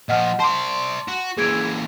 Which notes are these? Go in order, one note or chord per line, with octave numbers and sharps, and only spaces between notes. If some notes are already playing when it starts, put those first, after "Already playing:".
A#2 F3 D#5 F#5 F6
C5 D5 A5 C6
F#4
A#2 E3 G#4 G#6 D7